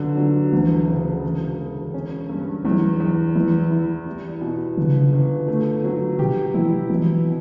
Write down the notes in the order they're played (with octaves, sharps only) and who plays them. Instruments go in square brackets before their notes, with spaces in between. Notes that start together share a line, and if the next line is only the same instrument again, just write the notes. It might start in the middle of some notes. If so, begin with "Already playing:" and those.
Already playing: [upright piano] G1 D3 F#3
F#3
[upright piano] D2 [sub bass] E3
[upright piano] C#3
E1
E1
C#4
G2
[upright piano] E2 [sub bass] F#3
[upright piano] E2
[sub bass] E3 [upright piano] E4
[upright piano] E4
G3
B2
[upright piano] G1 [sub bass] C#3
[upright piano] G1
A3
F#3
[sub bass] B2 [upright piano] G4
[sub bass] E3 [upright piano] E4
[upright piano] B2 [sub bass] E3
[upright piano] B2